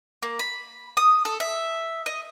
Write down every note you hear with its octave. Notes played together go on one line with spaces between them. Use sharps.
A#3
B5
D#6
A4
E5
D#5